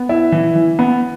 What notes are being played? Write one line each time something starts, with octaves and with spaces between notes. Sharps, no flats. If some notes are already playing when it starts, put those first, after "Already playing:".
Already playing: B3
E4
E3
E3
B3